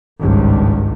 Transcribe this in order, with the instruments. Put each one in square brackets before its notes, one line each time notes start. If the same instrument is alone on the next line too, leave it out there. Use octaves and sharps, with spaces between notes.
[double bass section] G#1 C#2 G2